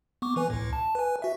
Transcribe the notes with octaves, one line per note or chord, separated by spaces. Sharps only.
B3 C#6 D6
E3 B4 G#5
C#2 A2
A5
B4 G#5
F#4 E5